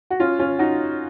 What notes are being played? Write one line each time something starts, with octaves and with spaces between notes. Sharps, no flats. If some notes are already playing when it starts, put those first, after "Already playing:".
F#4
C#4 F4
C#4 F4
D#4 F#4